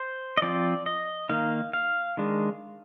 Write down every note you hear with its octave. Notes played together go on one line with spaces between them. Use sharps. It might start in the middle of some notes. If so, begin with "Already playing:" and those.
Already playing: C5
D#5
F3 C4 F4 D5
D#5
D#3 A#3 D#4 F5
F5
D#3 G#3 D4